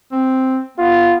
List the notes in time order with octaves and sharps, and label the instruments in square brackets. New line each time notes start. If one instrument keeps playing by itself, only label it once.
[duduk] C4
[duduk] B3 [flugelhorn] F4